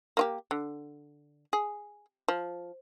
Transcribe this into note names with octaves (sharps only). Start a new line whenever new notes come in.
A#3 F4 G4
D3
G#4
F3